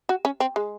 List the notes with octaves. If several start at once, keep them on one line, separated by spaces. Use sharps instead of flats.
F#4
C#4
C4
G#3